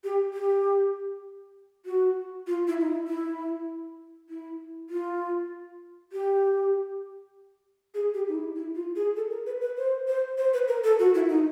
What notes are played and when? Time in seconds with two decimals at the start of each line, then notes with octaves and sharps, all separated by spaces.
0.04 G4
0.34 G4
1.86 F#4
2.47 F4
2.68 E4
2.81 D#4
2.87 E4
3.07 E4
4.29 E4
4.90 F4
6.12 G4
7.94 G#4
8.14 G4
8.28 D#4
8.34 E4
8.56 E4
8.75 F4
8.96 G#4
9.16 A4
9.31 A#4
9.46 B4
9.61 B4
9.77 C5
10.08 C5
10.38 C5
10.54 B4
10.68 A#4
10.84 A4
10.99 F#4
11.14 E4
11.29 D#4